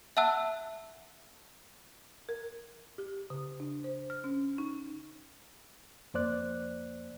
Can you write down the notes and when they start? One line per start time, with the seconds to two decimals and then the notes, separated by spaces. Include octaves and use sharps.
0.17 E5 F#5 A5 E6 F#6
2.29 A#4
2.98 G4
3.30 C#3
3.60 D4
3.84 C5
4.10 F6
4.24 C#4
4.58 D#4
6.14 F2 A#3 C5 D5 F#6